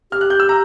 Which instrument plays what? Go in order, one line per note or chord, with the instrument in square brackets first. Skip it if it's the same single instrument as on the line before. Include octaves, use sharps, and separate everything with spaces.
[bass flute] G4 [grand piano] F6
[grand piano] F#6
G6
E6
A#5